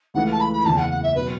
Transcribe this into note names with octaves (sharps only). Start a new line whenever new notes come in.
C#2 C#3 E3 A3 E4 F#5
A5
B5
B5
F#1 E2 C#3 A5
F#5
F#5
E5
B2 F#3 B4